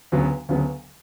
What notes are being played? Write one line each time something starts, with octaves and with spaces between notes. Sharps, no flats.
D2 C#3 F#3 B3
D2 C#3 F#3 B3